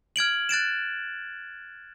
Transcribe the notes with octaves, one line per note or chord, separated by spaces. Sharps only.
F6 G#6 D7 F#7
F#6 A6 D7 E7